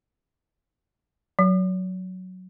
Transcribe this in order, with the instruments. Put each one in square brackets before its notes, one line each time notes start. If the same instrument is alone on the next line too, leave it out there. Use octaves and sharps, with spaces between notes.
[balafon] F#3